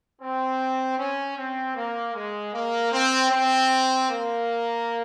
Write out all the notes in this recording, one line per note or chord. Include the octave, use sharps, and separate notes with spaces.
C4
C#4
C4
A#3
G#3
A#3
C4
C4
A#3